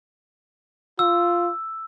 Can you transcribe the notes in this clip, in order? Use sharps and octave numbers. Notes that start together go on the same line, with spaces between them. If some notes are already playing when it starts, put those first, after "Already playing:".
F4 E6